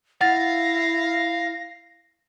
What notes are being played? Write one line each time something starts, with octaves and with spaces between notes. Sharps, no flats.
E4 F5 F#5 A6 A#6